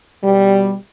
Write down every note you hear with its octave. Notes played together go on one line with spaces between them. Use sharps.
B2 G3